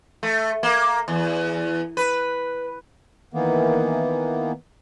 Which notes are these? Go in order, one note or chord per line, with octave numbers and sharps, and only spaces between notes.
A3
A#3
E2
B4
D#3 E3 A#3 B3